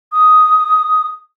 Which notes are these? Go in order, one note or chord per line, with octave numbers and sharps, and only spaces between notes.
D#6